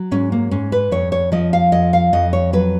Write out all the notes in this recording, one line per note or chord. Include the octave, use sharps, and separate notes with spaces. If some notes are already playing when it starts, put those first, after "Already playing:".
Already playing: F#3
G#2 C#4
A#3
G#2 C#4
B4
F2 C#5
C#5
F3 D#5
F5
F2 D#5
F5
F2 D#5
C#5
F#3 B4